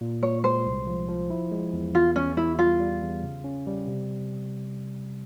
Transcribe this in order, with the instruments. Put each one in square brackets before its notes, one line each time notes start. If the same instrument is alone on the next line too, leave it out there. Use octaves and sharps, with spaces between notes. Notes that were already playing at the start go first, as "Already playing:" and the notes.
[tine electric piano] A#2
[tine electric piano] A#2 [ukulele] C#5
[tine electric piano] G#3 [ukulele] C5
[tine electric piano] C2
F3
F3
E4
G#3
E2
[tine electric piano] E2 [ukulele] F4
[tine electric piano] E2 [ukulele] C#4
[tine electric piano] E2 [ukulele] E4
[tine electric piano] G3 [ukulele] F4
[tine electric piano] G3
E2
C#3
C#4
G3
C3